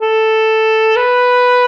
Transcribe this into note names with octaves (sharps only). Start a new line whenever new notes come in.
A4
B4